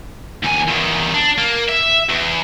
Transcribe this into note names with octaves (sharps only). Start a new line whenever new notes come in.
D#2 G#5
E2 D#3
D4
A#3
E5
E2